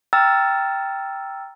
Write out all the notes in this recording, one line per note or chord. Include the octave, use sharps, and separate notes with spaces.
G5 A#5 E6 F6 A6